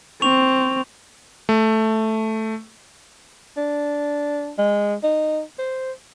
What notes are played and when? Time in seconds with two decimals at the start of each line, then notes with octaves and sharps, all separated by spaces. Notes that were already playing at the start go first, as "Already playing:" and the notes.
0.22 C4 C#6 F7
1.49 A3
3.57 D4
4.58 G#3
5.03 D#4
5.58 C5